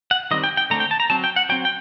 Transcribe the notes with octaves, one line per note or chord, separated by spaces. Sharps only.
F#5
D#3 G3 C4 D#5
G5
G5
D3 A3 C4 A#5
G5
A5
A#5
F#3 C4 A5
G5
F#5
F#3 C4 G5
G5